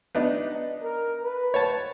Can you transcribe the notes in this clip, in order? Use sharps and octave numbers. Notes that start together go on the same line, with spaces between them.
B3 D4 D#4
A#4
B4
C#5 A5